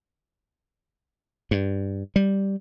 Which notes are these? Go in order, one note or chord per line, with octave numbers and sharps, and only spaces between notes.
G2
G3